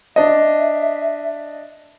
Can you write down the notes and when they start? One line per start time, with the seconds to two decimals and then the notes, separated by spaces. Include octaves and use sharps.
0.16 D4 D#5 E5